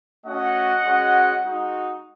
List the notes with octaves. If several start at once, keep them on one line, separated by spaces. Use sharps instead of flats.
A3 C#4 F#4 D#5 F#5
G#3 C#4 F#4
G#3 D#4 F#4